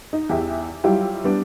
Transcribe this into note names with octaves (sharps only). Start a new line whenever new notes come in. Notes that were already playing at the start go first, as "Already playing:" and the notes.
D#4
E2 G4 E5
F#3 G3 E4 F4 G4
G3 B3 D4